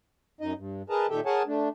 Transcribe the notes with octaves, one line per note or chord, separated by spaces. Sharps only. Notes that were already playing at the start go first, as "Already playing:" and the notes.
F#2 D#4 D#5
G2
G#4 A#4 B4 D#5 A5 A#5
A#2 D#3 G4 A4 E5 G5
G#4 A#4 C#5 F#5 G#5 A5
A3 D4